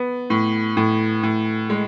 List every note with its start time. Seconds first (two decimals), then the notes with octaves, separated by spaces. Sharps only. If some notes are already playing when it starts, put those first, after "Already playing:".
Already playing: B3
0.30 A2
0.77 A2
1.23 A2
1.70 G#3